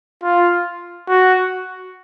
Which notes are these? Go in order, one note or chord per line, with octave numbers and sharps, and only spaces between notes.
F4
F#4